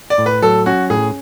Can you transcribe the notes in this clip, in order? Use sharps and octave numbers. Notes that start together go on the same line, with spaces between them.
D5
A2
B4
F#3 A4
C#4 F#4
A2 G#4